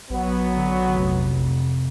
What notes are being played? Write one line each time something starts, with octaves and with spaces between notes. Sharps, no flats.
A#1 F#3 B3
D3
F1